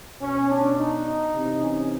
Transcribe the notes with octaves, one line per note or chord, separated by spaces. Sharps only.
B2 C#4
D4
D#4
C3 E3
C#4